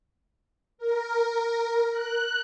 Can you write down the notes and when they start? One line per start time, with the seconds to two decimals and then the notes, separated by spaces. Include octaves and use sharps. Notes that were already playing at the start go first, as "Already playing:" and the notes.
0.78 A#4
1.91 F#6